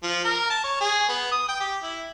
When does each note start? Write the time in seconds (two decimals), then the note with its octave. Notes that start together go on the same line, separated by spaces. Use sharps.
0.03 F3
0.25 A#4
0.50 A5
0.64 C#5
0.81 G#4
1.09 B3
1.32 D#6
1.49 G5
1.60 G4
1.83 E4